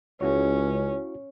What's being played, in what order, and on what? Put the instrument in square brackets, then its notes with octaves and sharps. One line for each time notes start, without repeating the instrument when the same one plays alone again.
[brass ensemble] C#2 [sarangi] C#4 [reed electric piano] E4 F#4 C#5